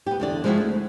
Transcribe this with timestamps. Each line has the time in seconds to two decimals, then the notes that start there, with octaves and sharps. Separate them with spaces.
0.06 B3 G4
0.20 E2 D3 D5
0.44 F3 G#3 C4 D#4 E4 F#4
0.58 D2